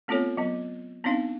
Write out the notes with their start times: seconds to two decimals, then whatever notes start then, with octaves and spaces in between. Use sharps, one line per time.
0.08 A3 B3 C4 F4 A4 C#5
0.37 F#3 B3
1.04 B3 C4 D4 D#4 F5